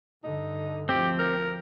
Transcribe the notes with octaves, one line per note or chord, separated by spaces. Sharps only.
G2 D3 D#4
D2 F3 C4 G4
A#4